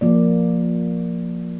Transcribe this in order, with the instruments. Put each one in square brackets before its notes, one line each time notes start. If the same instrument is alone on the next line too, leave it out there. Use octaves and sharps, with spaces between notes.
[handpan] F3 A#3 D5